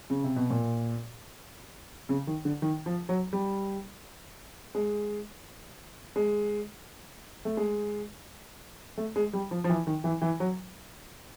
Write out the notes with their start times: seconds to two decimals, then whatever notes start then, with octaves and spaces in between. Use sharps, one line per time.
0.10 C#3
0.24 C3
0.36 B2
0.50 A#2
2.09 C#3
2.27 D#3
2.45 D3
2.62 D#3
2.86 F3
3.09 F#3
3.33 G3
4.75 G#3
6.16 G#3
7.45 A3
7.57 G#3
8.98 A3
9.16 G#3
9.33 G3
9.51 F3
9.64 F3
9.69 E3
9.87 D#3
10.04 E3
10.22 E3
10.40 F#3